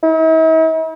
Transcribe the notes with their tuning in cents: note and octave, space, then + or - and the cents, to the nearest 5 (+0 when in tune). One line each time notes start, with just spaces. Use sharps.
E4 -45